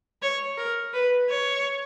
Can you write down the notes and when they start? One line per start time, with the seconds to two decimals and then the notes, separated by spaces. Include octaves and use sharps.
0.22 C#5
0.58 A#4
0.94 B4
1.29 C#5